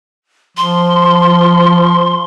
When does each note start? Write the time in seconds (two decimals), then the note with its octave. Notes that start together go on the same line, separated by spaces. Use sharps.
0.57 F3 C6